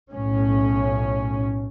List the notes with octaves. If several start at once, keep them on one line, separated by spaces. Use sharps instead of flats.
B1 A2 C#4